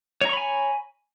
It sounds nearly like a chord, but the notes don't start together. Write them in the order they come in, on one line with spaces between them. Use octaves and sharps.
C#5 A#5 C#6 B5 G#5